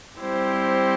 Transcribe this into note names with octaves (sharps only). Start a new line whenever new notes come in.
G3 C4 E4 G4 C5